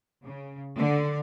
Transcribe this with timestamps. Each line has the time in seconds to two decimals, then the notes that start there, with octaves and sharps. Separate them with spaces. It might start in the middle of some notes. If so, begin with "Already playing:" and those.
0.23 C#3
0.77 D3